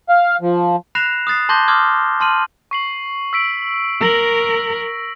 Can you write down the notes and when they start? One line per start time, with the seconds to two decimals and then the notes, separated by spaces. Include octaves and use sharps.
0.09 F5
0.41 F3
0.95 B5 F#6 A#6 C7 E7 F7
1.27 D#6 F#6 A6 C7
1.49 A5 C6 D6 G6 A#6 G7
1.68 C6 D6 D#6 F6 G#6
2.20 A5 C6 F6 D#7 F#7
2.71 C#6 C7 F#7
3.33 E6 B6 D7
4.01 A#4 E6 A#6 F#7